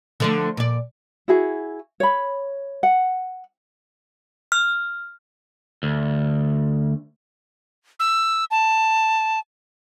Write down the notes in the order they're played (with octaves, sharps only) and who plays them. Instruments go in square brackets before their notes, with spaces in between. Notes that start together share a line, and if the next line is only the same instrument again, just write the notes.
[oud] D3 F3 A3
A#2 D5
[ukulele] E4 F#4 G#4
C#5 B5
F#5
[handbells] F6
[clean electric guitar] D2
[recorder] E6
A5